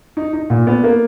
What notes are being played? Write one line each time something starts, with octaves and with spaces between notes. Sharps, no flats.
D#4
D#4
A#2
B3
A#3